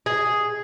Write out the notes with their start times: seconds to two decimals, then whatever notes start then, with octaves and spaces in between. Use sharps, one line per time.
0.06 G#4